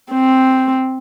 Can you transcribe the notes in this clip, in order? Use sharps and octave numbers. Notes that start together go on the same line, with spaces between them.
C4